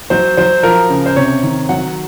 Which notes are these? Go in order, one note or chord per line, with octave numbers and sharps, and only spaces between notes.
F#3 C5
F#3 C5
F3 A#4
C#3
C5
C3 C#5
D#3
F#3 F#5